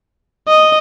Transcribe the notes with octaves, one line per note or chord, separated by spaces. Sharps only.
D#5